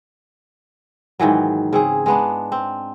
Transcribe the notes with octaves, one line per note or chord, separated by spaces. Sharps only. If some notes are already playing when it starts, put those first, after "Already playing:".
G#2 D#3 E3 F#3
C#3 C4 G#4
G#3 B3 D4
C4